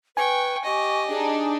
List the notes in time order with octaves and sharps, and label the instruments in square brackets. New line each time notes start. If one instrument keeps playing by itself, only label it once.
[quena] B4 [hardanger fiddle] G5 C#6 [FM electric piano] G#5
[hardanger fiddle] G4 D#5 [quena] C#6
[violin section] D4 D#4 [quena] G#4